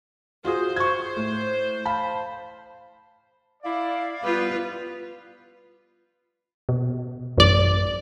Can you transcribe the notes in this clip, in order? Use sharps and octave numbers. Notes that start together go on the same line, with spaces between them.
F4 F#4 G#4 C5
C#6 G#6
A2
F5 A5 B5
E4 D5 F5
G3 B3 F4 B4
B2
A1 F#2 D5